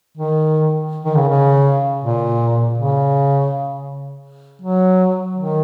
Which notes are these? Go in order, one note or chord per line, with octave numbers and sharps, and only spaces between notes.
D#3
D#3
C#3
C#3
A#2
C#3
F#3
D#3